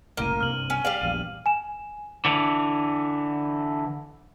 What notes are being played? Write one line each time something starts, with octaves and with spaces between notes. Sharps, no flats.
F#1 C2 A2 A#3 F6 D#7
C2 G2 C3 F6 F#7
C#4
G3 D5 F5 F#7
A#1 E2 G2 D#7
G#5 E7
D3 E3